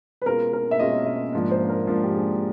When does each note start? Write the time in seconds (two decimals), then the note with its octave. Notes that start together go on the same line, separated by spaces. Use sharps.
0.22 B4
0.26 B2 G#3 C#4 F4 A#4
0.53 A#4
0.71 E5
0.79 B2 G#3 C#4 F4 D#5
1.06 D#5
1.33 G#2 F3 A#3 D4
1.51 C5
1.69 A#4
1.87 G#2 F3 A#3 D4
2.04 G4
2.14 G#4